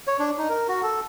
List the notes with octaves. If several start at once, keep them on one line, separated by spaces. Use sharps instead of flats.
C#5
D4
D#4
A#4
F#4
A4